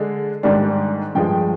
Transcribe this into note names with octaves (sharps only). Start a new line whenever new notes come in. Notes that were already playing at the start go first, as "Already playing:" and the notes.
Already playing: D3 G#3 D4
G#2 D#3 G3 D4
G2 F3 G#3 G5